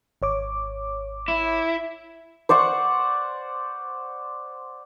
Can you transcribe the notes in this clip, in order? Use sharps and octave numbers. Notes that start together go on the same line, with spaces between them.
G#1 C#5 D6
E4
C5 D5 F#5 C#6